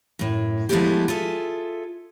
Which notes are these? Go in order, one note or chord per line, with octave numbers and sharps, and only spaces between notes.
F#2 A2
F3 G#3 A3 B3 E4 G4
F4 G#4 A4 E5